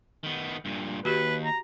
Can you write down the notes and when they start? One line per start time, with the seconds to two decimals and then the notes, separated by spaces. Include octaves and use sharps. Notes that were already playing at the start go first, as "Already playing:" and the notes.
0.24 D#3 B3
0.65 G2 A#2
1.05 D#2 F#4 G4 B4
1.45 A#5